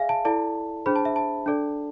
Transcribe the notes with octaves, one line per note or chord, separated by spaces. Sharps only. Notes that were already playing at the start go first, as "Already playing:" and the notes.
Already playing: G#4 D5 E5 F5 G#5
A5
E4 A4 D5 A5
D4 G#4 C5 B5
A5
E5
A5
D4 A4 D5